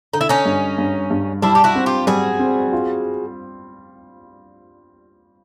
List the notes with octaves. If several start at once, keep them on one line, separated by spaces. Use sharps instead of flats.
D3 D#4
E4
C#4 D#4
G2
G2
G2
G3 D4 E4
G4
E4 F#4
C4
F4 G4
G3 F#4 G#4
C4
F4